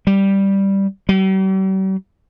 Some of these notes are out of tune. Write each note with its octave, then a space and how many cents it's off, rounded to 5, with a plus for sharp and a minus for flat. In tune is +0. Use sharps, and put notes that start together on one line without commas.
G3 +0
G3 -45